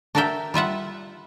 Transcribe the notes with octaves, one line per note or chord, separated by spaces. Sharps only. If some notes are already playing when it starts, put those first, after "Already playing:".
D4 F#4 A#4 D5 E5 G5
G3 F4 E5 F#5